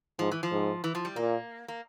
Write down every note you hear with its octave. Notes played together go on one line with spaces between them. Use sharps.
G#2 F3
E3
F3
G#2
E3
F3
G3
A#2 A#3
A#3